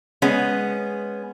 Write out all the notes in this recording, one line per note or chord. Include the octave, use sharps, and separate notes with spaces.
G#3 B3 C#4